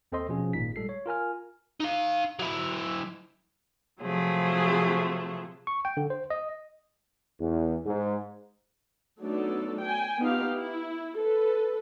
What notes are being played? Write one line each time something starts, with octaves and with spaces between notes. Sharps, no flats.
D#2 C4 A4 C5 D#5 C6
B2 F3 C#4 G#4
G#1 A#2 D#4 B6
G3 G#3 A4 C7
C#5
F4 A#4 G#5 F6
D#4 F5
F#3 E4
C3 F3 F#3 A3 G#4
C#6
G5
D3
C5
D#5
E2
G#2
F#3 A3 B3 D4 D#4 A4
G5 G#5
B3 D#4 F4 G4 F5
E4
A4 B4